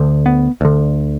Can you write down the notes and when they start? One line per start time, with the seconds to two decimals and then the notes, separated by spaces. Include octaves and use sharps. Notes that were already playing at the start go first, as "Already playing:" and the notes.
Already playing: D2 D3
0.26 B3
0.61 D2 D3